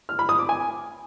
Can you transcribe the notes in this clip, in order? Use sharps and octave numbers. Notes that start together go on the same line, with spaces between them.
F6
B5
D#6
D6
G#5